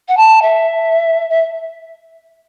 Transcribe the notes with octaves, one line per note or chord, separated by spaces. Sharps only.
F#5
A5
E5
E5